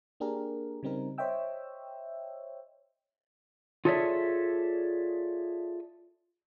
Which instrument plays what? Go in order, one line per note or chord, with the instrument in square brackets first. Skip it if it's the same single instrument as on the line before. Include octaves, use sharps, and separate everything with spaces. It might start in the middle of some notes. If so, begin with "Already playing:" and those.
[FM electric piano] A#3 D4 G4 G#4 A#4
C#3 G3 C4 D#4 A#4
C5 C#5 D#5 E5 G5 E6
[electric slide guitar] F4 G#4 A4 C#5 D5 E5